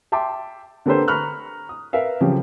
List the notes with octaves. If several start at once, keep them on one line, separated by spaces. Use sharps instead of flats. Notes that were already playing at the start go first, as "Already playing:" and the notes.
E5 G5 A5 C6 D6
D3 A#3 G4 A4 B4 C5
A#5 B5 C#6 F6 F#6
D#6
A#4 B4 E5 F5
C#3 F3 F#3 C#4 G4